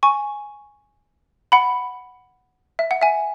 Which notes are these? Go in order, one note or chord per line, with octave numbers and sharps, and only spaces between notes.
G#5 C#6
F#5 B5
E5
F#5
E5 G#5